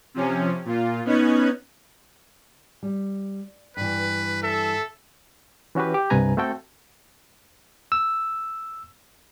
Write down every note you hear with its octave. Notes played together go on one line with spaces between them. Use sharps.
C3 F3 C#4
A#2 F4
B3 C#4 D#4 F#6 G#6
G3
G2 E3 B4
A4 E5
E3 C#4 F#4 G4 B4
G4
C2 G2 C3 B4 G#5 A#5
A3 C4 F#4 A4 G5
E6